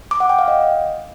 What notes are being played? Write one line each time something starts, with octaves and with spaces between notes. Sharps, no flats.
D6
F#5
G5
F5
D#5